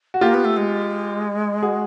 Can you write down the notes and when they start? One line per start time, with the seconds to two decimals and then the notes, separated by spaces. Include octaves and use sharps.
0.14 F#4
0.21 A#3 F4 G4
0.34 B3
0.45 A3
0.57 G#3
1.63 F#4 G#4